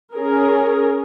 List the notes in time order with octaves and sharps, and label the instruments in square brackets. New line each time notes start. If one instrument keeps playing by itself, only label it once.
[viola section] C#4 G#4 A#4